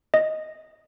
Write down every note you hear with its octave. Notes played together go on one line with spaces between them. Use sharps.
D#5